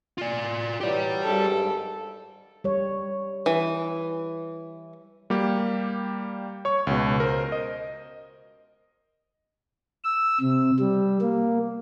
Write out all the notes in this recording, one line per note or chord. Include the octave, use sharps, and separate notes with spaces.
F4 D5
E3 F#3 G4 D5
G#1 G2 A4
G3 C#5
E3
G3 A#3 G4
C#5 C#6
C#2 B2
A#4 C5
D#5
E6
C3
G3
A#3